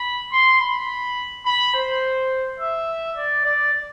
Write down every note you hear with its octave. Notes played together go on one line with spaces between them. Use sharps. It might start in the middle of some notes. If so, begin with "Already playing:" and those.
Already playing: B5
C6
B5
B5
C5
E5
D5
D5